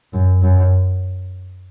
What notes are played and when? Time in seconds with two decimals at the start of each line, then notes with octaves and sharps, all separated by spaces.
0.13 F#2
0.42 F#2